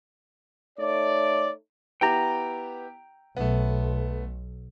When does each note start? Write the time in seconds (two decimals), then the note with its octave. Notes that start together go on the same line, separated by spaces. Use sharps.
0.79 A3 D#4 C#5 D5
2.01 B3 E4 G4 G5 A#5
3.37 B1 A3 B3